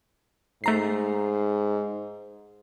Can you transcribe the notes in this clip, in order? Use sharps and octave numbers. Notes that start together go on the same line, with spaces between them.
G#2 A3 A#5 C7